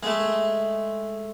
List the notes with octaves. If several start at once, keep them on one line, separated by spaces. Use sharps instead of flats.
G#3 A3